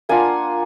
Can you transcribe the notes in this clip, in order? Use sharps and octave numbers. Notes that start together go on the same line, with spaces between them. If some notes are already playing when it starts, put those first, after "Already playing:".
A#3 D4 F4 F#5 G#5